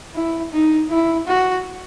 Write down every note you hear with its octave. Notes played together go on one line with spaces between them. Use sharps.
E4
D#4
E4
F#4